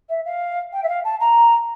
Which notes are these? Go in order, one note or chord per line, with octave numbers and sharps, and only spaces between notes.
E5
F5
G5
E5
F5
A5
A#5